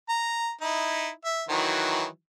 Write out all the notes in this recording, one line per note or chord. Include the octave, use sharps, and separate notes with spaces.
A#5
D#4 E4
E5
D#3 E3 F#3